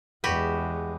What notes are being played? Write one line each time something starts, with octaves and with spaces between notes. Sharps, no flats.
E2 G#3 F#4 G4 B4